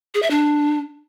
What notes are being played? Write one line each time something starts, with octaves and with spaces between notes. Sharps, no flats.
G#4
E5
D4